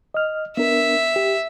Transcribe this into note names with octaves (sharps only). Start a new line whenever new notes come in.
D#5 F6
B3 D4 A#4 E5
G4